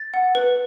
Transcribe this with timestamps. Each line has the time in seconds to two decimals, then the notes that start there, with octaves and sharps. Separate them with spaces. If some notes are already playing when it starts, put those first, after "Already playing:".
Already playing: A6
0.14 F#5
0.35 B4